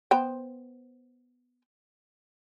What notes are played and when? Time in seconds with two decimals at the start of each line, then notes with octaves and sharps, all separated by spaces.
0.11 B3 C5 G5